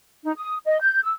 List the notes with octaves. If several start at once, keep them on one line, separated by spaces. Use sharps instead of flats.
D#4
D#6
D#5
G6
E6